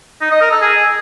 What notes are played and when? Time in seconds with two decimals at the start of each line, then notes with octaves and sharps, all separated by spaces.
0.21 D#4
0.31 D#5
0.41 A#4
0.51 A4
0.61 G#4